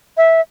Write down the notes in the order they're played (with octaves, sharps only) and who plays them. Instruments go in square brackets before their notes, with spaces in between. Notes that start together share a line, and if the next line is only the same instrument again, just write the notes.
[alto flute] E5